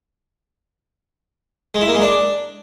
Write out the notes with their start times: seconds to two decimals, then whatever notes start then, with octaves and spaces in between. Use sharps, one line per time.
1.74 G#3
1.81 E4
1.88 A#3
1.95 G#3
2.02 D4